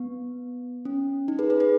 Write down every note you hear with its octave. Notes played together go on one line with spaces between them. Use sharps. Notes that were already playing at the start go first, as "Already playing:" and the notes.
Already playing: B3
C#4
D#4
G#4 B4
G#4 B4
G#4 B4